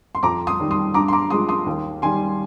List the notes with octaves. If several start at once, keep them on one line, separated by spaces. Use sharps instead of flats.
C6
F2 A#5 D6
C6 D#6
D#3 G3
C6 D#6
G2 A#5 D6
C6
A#5 D6
F3 G#3 C6 D#6
C6 D#6
D#2
D#3 G3 G#5 C6